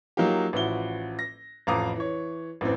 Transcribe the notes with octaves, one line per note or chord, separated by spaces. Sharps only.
F#3 A#3 D#4 F4 G4
A1 F3 E4 F#4 G7
A#6
A1 F2 F5 A#5 D6 D#6
E3 C#5
A1 F#2 E3 C4